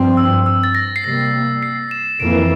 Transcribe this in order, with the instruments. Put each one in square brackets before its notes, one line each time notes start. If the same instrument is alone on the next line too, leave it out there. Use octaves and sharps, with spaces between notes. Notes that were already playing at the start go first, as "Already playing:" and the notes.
Already playing: [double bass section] G2 F3 C4
[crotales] E6
E6
A6
A#6
C7
[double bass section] C3 G3 A#3 [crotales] A#6
[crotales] C7
E7
[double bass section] F2 E3 A#3 [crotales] D7